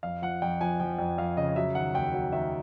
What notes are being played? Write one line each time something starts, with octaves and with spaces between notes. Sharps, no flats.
F2 F5
F3 F#5
F2 G5
F3 G#5
F3 G5
F2 G5
F2 F5
C#3 D#5
F#3 E5
D#3 F#5
D#2 G5
F#3 F#5
D#3 E5